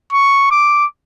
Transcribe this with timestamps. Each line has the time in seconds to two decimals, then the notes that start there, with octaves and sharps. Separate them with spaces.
0.13 C#6
0.52 D6